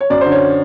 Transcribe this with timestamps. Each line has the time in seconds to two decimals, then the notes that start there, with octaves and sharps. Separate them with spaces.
0.01 C#5
0.10 F#2 D5
0.21 C5
0.26 D3
0.32 C#5